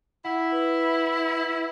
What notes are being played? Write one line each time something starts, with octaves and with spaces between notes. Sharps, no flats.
E4 F#5
B4
B5
B5
B5